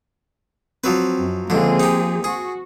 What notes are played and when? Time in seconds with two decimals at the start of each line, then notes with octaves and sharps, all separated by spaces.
0.84 F3 F#3 C4 B4
1.19 F#2
1.50 C#2 D3 F3 A#3 C4 G#4
1.80 D#4 G4
2.24 F#4 G#4